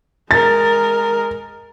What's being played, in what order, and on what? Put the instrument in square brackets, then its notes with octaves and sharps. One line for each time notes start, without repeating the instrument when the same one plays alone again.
[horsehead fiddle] G#3 A#4 [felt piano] A6